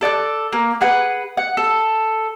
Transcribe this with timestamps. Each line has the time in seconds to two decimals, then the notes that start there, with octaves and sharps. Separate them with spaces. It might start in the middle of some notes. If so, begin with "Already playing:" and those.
0.01 A4 D5 E6 F#6
0.53 A#3
0.81 G#4 B4 F#5
1.37 F#5
1.57 A4